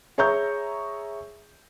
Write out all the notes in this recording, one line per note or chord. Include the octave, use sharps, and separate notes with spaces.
G#4 C#5 E5 A#5 C#6 G6